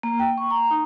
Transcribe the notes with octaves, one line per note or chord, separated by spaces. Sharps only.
A#3
G5
C#6
A#5
D#4